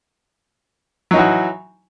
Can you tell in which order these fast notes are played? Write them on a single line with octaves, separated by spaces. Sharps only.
F#3 D#4 E3 F#4